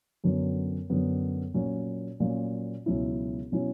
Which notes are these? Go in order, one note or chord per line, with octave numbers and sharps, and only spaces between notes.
F#2 D3 F#3 B3
F#2 D3 F#3 B3
A#2 F#3 C#4
A#2 F#3 C#4
C#2 B2 F#3 C#4 E4
B2 F#3 C#4 E4